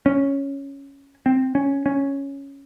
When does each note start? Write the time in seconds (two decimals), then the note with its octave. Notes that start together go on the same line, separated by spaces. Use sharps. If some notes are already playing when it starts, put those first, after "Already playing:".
0.06 C#4
1.26 C4
1.55 C#4
1.86 C#4